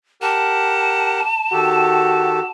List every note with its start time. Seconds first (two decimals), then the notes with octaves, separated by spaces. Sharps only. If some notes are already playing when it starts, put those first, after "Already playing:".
0.22 G4 A#4 F#5 A5
1.53 D#3 F#4 G4 A4